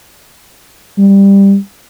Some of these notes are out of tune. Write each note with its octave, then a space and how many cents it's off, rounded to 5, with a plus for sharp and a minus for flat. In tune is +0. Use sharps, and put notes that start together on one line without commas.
G3 +10